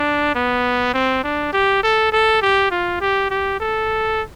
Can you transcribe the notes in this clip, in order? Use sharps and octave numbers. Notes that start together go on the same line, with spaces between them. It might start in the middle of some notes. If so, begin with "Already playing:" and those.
Already playing: D4
B3
C4
D4
G4
A4
A4
G4
F4
G4
G4
A4